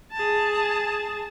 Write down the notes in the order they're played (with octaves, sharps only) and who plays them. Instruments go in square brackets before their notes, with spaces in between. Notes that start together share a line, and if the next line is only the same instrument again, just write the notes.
[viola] G#4 A5